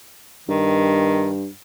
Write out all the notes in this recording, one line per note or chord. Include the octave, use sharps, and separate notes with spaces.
G2 D#3